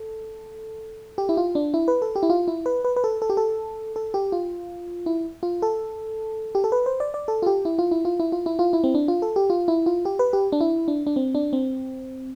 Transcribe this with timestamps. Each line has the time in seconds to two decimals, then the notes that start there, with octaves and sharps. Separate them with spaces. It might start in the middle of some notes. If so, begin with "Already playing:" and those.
Already playing: A4
1.18 G4
1.29 E4
1.37 F4
1.55 D4
1.74 E4
1.88 B4
2.02 A4
2.16 G4
2.23 E4
2.30 F4
2.48 E4
2.66 B4
2.85 B4
2.96 B4
3.04 A4
3.22 A4
3.30 G4
3.37 A4
3.96 A4
4.14 G4
4.32 F4
5.06 E4
5.43 F4
5.62 A4
6.55 G4
6.64 A4
6.72 B4
6.86 C5
7.00 D5
7.14 D5
7.28 A4
7.42 F4
7.46 G4
7.65 E4
7.79 F4
7.91 E4
8.05 F4
8.20 E4
8.32 F4
8.46 E4
8.59 F4
8.73 E4
8.84 C4
8.95 D4
9.08 F4
9.22 A4
9.36 G4
9.50 F4
9.68 E4
9.86 F4
10.05 G4
10.19 B4
10.33 G4
10.52 D4
10.61 E4
10.88 D4
11.07 D4
11.16 C4
11.35 D4
11.53 C4